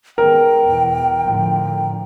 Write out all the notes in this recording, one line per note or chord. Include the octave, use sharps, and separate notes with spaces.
D#3 G#3 B3 A#4 G5
E2 B2 E3
A2 D3 F3